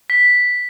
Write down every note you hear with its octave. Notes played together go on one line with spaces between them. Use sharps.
B6